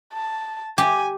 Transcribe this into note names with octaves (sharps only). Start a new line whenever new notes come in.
A5
G4 G#5